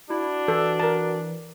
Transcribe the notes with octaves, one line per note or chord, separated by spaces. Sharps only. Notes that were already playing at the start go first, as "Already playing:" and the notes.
D4 E4 F#4
E3 A4
A#4 A5